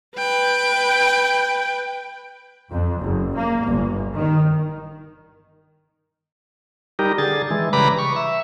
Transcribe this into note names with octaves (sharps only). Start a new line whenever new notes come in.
B4 G5
F2
F#1
A#3
G1
D#3
G3 D#4 G4 A#4
D3 G#4 A6
E3 G#3
C#3 G3 B4 A#5 B5 D6
C#6
E5